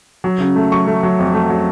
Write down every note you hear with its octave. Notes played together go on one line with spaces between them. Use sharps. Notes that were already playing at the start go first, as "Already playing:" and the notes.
F#3
C#3
A3
F#3 C#6
A3
F#3
F2
A3
F#3